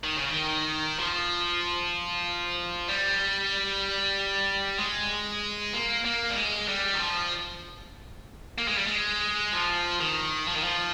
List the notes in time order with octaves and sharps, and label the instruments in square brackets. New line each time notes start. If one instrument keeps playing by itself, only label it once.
[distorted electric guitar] D#3
C#3
D#3
F3
G3
G#3
A#3
A#3
G3
G#3
G3
D#3
F3
A#3
G#3
G3
G#3
F3
D#3
F3
D#3
F3